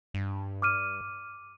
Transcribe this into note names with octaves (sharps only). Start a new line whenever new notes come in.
G2
D6 F6 D#7